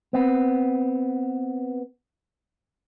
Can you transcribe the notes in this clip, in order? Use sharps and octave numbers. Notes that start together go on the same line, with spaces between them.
B3 C4